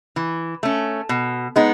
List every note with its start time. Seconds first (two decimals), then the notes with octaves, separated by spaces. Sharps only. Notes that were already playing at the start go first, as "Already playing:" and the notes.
0.16 E3
0.63 A3 C#4
1.09 B2
1.56 G#3 B3 D#4